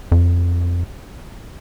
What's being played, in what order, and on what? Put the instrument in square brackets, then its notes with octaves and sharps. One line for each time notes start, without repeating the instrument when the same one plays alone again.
[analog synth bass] F2